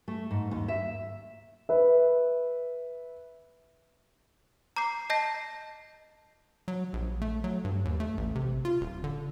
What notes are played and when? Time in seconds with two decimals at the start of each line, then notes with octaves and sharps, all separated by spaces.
0.08 A3
0.31 G#2
0.51 D#2
0.68 E5
1.69 B4 E5
4.76 A#5 D6 G6 C7
5.10 D#5 A5 G6 A#6 C7
6.68 F#3
6.93 A#1
7.22 A3
7.44 F#3
7.65 G2
7.85 D#2
8.00 A3
8.17 A1
8.35 C3
8.65 F4
8.81 D#1
9.04 D3